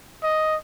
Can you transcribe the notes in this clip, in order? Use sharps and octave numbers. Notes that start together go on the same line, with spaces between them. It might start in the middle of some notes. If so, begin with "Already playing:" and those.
D#5